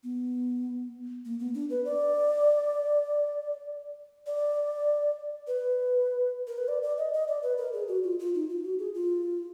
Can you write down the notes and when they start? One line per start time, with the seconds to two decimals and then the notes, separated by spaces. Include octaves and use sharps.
0.03 B3
1.25 A#3
1.40 B3
1.54 D4
1.70 B4
1.85 D5
4.26 D5
5.47 B4
6.47 A#4
6.58 B4
6.68 D5
6.82 D5
6.98 D#5
7.14 D#5
7.28 D5
7.43 B4
7.58 A#4
7.73 G#4
7.88 F#4
8.04 F4
8.19 F4
8.35 D#4
8.49 F4
8.64 F#4
8.79 G#4
8.94 F4